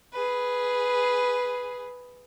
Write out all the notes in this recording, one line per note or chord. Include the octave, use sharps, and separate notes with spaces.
G#4 B4